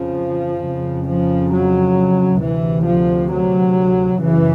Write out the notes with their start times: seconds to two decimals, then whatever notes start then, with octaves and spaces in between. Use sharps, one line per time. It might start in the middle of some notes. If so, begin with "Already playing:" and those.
Already playing: F2 C#3 F3
0.63 F2 C#3
1.07 F3
1.52 F#3
2.41 D2 C3 E3
2.85 F3
3.31 F#3
4.20 F#2 C#3 E3